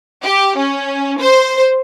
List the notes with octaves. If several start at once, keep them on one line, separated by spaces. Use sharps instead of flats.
G4
C#4
C5